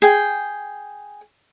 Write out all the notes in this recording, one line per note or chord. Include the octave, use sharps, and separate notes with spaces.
G#4 G5